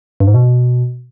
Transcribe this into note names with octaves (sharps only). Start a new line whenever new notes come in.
G2
G#2
B2